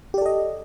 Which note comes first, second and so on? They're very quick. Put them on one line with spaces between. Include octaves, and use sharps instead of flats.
G4 D5 A4 D#5